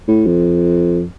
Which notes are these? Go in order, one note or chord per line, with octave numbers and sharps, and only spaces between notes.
A2
F2